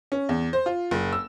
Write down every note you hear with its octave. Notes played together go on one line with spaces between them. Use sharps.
C#4
E2
C5
F4
F#1
E6